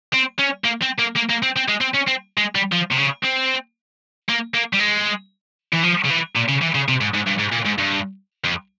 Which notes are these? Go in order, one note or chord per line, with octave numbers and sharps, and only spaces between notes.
C4
C#4
A#3
C4
A#3
A#3
A#3
C4
C4
G#3
C4
C#4
C4
G#3
G3
F3
C3
C#3
C4
A#3
A#3
G3
G#3
E3
F3
C#3
E3
A#2
C#3
E3
C#3
C3
G#2
G#2
G2
G#2
A#2
G#2
G2
F2